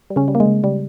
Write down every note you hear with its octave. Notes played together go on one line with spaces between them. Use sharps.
G3
C#3 C#4
G3
A#3
G#3
C#3
C#3 G3